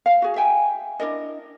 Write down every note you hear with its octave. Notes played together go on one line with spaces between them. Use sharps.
F5
F#4 G#4
E5 G5 G#5
D4 E4 A#4 D#5